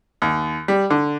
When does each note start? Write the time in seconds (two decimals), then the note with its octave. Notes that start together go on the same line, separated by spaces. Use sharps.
0.22 D#2
0.68 G3
0.90 D3